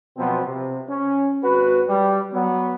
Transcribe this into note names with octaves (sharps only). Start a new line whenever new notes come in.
B2 F3 F#3 B3 C4
C3
C#4
G#1 F#4 B4
G3
F#3 B3